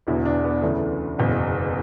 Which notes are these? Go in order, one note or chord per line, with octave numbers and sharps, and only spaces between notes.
E1 E2 D3 F#3 E4
D4
B3
D2 C#3 E3 A3
F#1 E2 B2 F#3